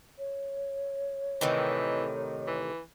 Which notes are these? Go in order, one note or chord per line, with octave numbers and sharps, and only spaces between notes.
C#5
A2 C3 D#3 E3
E3